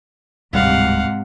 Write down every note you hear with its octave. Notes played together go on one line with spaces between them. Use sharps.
D1 G#2 C3 G3 F5 F#5